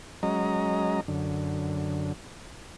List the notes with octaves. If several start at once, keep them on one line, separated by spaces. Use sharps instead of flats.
F#3 G#3 C#4 D#5 A#5
F#2 D3